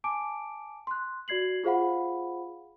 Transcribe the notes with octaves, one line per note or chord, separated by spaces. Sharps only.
G#5 A5 D6 D7
C6 F#6
F#4 D5 G#6 C7 F#7
F4 G#4 C5 F5 F#5 B5